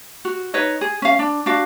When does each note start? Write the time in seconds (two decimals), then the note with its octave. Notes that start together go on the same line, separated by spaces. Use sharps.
0.25 F#4
0.54 D#4 B4 C#5 D#5
0.81 G#4
1.02 C#4 F5
1.19 D4
1.46 D4 F#4 F5